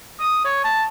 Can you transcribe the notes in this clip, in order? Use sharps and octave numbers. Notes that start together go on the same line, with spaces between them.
D#6
C#5
A5